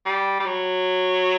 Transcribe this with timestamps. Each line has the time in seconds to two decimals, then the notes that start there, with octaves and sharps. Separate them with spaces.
0.06 G3
0.40 G3
0.46 F#3